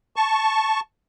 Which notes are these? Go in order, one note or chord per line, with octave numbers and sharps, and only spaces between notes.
A5 C#6